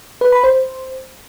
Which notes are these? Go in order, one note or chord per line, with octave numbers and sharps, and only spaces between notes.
B4
B5
C5